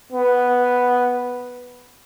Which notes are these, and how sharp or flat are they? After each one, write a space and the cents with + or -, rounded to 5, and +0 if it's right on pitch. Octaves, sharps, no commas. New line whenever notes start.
B3 -5